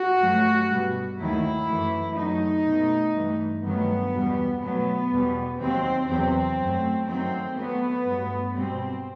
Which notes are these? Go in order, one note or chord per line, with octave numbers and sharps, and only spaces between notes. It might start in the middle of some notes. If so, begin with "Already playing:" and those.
Already playing: F#4
G2 F#3 A3
B2 G3
D#2 D#3 F#3 A3 E4
F#2 E3 A3
F#2 F#3 A3 D#4
B2 A3
G2 E3 A3
G2 D#3 F#3 A3 B3
E2 B2 G3
B2 F#3 A3 B3
E2 B2 G3
D#2 D#3 F#3 C4
E2 C3 F#3 C4
F#2 F#3 A3
F#2 D#3 F#3 A3 C4
A2 F#3 A3 B3
G2 F#3 A3
B2 G3 C4